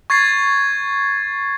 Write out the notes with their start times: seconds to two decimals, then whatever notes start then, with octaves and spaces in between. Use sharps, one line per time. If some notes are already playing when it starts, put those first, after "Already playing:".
0.10 C#6 G#6 A6 C7